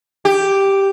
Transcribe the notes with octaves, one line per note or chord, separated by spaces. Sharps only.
G4